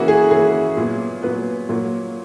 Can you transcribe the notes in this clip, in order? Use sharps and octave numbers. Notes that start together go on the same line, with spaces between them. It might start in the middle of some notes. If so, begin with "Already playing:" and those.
Already playing: C#3 E3 A#3 F#4
G#4
C#3 E3 A#3 G#4
A#2 F#3 B3
A#2 F#3 B3 B4
A#2 F#3 A#3